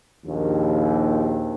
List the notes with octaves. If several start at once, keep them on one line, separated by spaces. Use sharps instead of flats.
A#1 D#2